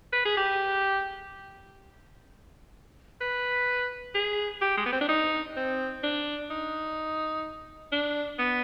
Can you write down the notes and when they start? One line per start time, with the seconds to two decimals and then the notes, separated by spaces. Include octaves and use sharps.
0.13 B4
0.25 G#4
0.37 G4
3.21 B4
4.15 G#4
4.61 G4
4.77 G#3
4.86 B3
4.92 C4
5.01 D4
5.09 D#4
5.56 C4
6.03 D4
6.50 D#4
7.92 D4
8.39 B3